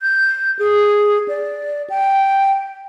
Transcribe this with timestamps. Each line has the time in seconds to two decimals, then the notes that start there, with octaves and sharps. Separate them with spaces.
0.02 G6
0.59 G#4
1.28 D5
1.90 G5